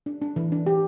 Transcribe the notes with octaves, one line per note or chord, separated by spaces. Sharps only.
D4
D4
E3
D4
G4